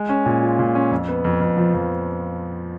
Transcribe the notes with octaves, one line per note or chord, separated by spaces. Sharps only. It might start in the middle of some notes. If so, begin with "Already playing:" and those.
Already playing: G#3
C#4
A#2
F4
A#2
C#4
F2
B3
F2
F2
F3
F2